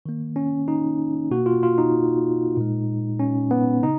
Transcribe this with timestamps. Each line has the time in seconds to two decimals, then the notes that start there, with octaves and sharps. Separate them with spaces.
0.06 D#3 A#3
0.36 C#4
0.68 D#4
1.31 B2 A#3 F#4
1.46 F4
1.63 F4
1.78 D#4
2.57 A#2 G#3
3.20 C#4
3.51 B3
3.82 C#3 D#4